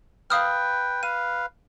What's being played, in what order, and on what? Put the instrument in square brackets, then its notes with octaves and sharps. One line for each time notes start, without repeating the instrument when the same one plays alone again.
[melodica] B4 G5 [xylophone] F5 D#6 F6
[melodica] B4 F5 [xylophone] D#7